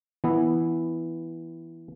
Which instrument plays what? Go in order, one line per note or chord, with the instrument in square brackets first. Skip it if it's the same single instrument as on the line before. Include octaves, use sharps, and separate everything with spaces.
[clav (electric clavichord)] E3 B3 E4